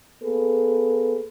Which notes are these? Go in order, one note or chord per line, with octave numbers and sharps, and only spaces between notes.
A#3 B3 G#4 A4 B4